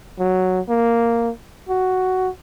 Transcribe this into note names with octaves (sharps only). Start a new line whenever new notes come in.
F#3
A#3
F#4